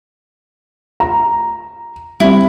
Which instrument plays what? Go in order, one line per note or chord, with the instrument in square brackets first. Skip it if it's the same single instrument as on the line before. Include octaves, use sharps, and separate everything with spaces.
[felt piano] A#5
[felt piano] G3 C4 [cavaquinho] E4